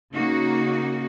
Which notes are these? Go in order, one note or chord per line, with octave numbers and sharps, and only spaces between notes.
C#3 A#3 D#4 F#4